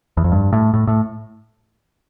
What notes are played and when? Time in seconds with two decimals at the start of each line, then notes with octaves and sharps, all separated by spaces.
0.17 E2
0.24 F2
0.32 G2
0.53 A2
0.74 A2
0.87 A2